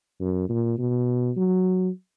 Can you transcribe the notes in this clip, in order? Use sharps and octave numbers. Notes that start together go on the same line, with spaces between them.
F#2
A#2
B2
F#3